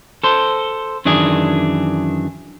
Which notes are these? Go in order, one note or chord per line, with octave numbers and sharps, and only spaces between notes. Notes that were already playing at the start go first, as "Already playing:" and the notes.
A4 C5
F#2 D#3 E3 D4 G#4